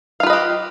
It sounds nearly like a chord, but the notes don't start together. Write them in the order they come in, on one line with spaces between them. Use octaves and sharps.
F5 F4 B4 D#5 G4